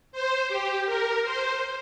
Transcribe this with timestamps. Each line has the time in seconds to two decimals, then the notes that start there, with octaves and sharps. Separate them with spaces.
0.12 C5
0.48 G4
0.86 A#4
1.23 C5